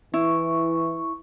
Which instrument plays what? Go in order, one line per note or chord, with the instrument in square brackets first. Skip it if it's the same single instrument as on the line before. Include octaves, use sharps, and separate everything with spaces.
[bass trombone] E3 [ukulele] E4 [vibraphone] C#6